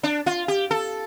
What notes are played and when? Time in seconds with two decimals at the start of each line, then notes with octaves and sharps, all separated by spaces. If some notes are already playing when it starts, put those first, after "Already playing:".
0.03 D4
0.26 F4
0.48 G4
0.71 A4